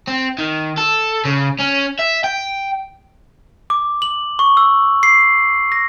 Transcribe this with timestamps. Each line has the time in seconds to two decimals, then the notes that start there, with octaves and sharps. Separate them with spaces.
0.08 C4
0.39 D#3
0.78 A4
1.25 C#3
1.59 C#4
1.99 E5
2.24 G5
3.70 D6
4.02 F#7
4.39 C#6
4.57 E6
5.03 C7
5.72 A#6